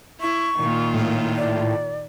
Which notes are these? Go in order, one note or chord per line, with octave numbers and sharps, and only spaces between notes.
E4 C#6
A#2 D#3 F4
A2
D5